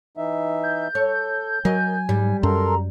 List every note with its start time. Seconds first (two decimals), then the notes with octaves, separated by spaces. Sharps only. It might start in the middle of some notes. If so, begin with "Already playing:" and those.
0.17 E3 D#4 E5
0.64 G6
0.95 A4 C#5
1.65 F#3 A#4 D#5 G#5
2.09 G#2 G3
2.43 F#2 A4 A#4 A#5 C6